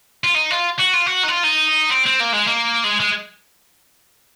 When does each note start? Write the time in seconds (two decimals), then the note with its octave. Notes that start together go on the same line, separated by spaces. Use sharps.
0.24 F4
0.35 D#4
0.51 F4
0.79 F#4
0.93 F4
1.06 F#4
1.24 D#4
1.29 F4
1.44 D#4
1.90 C4
2.06 C4
2.20 A#3
2.33 G#3
2.47 A#3
2.84 G#3
3.00 G#3